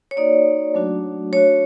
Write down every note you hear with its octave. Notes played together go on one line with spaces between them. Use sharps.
C#5
A#3 D#4 F#4 D5
F#3 A3 D4 F#4
A3 D4 F#4 C#5